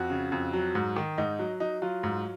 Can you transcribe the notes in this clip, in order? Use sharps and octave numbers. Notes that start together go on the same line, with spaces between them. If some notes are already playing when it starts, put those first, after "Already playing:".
Already playing: F2 F#4
C#3
F2
F#3
G#2
D#3
G#2 D#4
F#3
F#3 D#4
F#3 F4
G#2